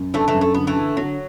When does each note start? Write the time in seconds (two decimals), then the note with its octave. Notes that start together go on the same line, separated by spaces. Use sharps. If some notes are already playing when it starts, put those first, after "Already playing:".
Already playing: F#2
0.14 E3 A3 D4
0.28 E3 A3
0.34 F#2
0.41 A3
0.54 D3 B3
0.67 E3 A3
0.76 D3
0.97 D3 F#3